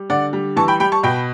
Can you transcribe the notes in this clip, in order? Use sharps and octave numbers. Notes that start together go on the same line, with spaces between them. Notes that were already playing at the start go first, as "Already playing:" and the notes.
Already playing: G3
D3 D5 F#5
G3
E3 A5 C#6
G5 B5
G3 G5 B5
A5 C#6
B2 G5 B5